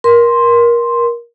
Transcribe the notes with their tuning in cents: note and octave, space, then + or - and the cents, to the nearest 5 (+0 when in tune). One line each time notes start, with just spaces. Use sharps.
A#4 +25 C6 +0